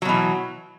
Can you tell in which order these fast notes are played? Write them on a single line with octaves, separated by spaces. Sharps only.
F#3 B2 E3